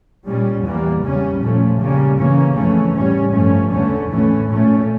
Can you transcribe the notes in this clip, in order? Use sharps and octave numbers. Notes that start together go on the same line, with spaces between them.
A#2 G3 C#4
E2 E3 G3 A#3
C#3 G3 C#4
A#2 F3 A3 C#4
C#3 G3 A#3 C#4
C#3 E3 A#3 C#4
F2 C#3 E3 A3 C#4
A2 G3 C#4
G2 F3 A3 C#4
E2 D3 A3 C#4
A2 E3 A3 C#4
A#2 A3 C#4